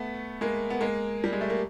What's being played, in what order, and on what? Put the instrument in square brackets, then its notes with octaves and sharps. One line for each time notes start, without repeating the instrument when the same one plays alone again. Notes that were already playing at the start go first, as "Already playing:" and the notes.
Already playing: [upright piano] A3 B3
G#3 A#3
B3
G#3 A#3
G3
G#3
A3
A#3